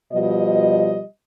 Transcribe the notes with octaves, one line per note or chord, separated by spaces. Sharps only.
B2 F3 G3 D#5